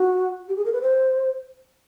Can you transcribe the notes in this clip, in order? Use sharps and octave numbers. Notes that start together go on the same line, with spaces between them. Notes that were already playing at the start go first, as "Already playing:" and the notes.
Already playing: F#4
G4
G#4
A#4
B4
C5